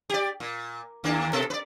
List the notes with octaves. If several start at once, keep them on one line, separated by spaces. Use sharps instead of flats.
G4 D5
A#2
D#2 A#3 D4
B2 A4 A#4
B4 D5